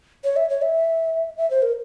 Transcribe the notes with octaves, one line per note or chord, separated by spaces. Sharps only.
C#5
E5
C#5
E5
E5
C5
A#4